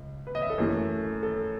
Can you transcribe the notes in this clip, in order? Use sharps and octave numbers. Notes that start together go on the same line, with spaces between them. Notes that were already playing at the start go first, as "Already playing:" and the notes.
Already playing: C#2
B4
D#5
E5
A4
F#2 E3 A3
A4